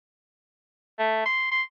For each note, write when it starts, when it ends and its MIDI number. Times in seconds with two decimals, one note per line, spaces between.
0.99 1.21 57
1.26 1.49 84
1.52 1.62 84